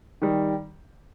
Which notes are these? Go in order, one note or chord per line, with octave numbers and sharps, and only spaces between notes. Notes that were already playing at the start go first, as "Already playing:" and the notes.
D#3 G3